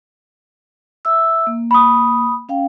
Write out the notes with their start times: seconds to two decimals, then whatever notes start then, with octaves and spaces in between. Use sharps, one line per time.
1.05 E5 E6
1.47 A#3
1.71 B5 D#6
2.49 C#4 F5 G5